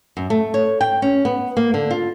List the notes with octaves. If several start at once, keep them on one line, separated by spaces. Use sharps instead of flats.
F#2
A3
C#5
G5
C#4
B3
A#3
D3
F4